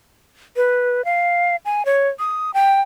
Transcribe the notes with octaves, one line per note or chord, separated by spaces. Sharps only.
B4
F5
G#5
C#5
D#6
G5